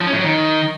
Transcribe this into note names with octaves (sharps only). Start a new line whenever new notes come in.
F3
C#4
A2
F#3
D#3